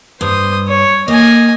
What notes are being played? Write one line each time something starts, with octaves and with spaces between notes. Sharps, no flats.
G2 C5 D#6
C#5
A#3 D#5 G#5